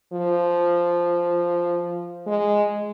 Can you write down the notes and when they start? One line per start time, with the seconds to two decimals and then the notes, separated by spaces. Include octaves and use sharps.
0.13 F3
2.27 G#3